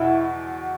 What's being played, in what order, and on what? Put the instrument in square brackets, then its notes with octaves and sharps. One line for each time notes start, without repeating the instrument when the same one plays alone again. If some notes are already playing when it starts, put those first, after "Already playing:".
Already playing: [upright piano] E2 B2 [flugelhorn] E4